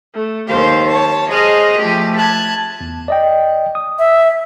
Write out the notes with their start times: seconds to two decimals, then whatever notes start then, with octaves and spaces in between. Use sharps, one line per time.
0.13 A3
0.48 D#2 G4 C5 F5
0.87 C#5 A5
1.28 G#4 C5 D#5 F6 F#6
1.78 F3 A3 G4
2.17 A5 F#6 G#6
2.81 E2
3.08 D5 D#5 G5
3.75 D#6
3.99 E5